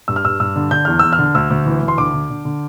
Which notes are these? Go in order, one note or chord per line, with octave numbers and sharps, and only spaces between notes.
G2 E6
F6
G2 E6
G2 E6
D3
D3 G6
E2 F6
E2 E6
F6
D3
D2 E6
D2
E3
D2
C6
D3 D6
D3
D3
D3